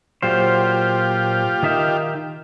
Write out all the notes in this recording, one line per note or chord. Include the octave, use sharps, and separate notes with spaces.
A#2 F#3 F4 G4 C5
D#3 D#4 E5